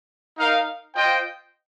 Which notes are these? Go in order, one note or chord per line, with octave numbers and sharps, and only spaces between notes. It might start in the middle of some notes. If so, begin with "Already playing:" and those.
D#4 A#4 F5
F4 C5 D#5 G5